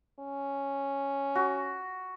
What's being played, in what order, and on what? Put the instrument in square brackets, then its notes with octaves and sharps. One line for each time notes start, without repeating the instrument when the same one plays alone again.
[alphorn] C#4
[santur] F#4